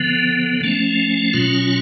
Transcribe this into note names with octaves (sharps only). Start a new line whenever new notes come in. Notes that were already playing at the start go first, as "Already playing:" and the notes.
Already playing: D3 F3 B3
F3 A3 C#4
B2 F#3 C#4 F4